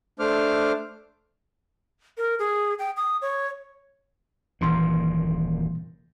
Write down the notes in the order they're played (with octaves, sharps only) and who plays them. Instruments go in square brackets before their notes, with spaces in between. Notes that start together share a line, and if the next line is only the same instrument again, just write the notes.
[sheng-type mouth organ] A3 D4 C5 D6 F6
[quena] A#4
G#4
G5
D#6
C#5
[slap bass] D#1 F#2 A#2 [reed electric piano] E3 C6